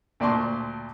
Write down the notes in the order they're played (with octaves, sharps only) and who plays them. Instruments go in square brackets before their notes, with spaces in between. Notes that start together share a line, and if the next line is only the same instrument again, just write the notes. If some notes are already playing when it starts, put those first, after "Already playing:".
[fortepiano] D2 A#2 D5 A5 C6 C#6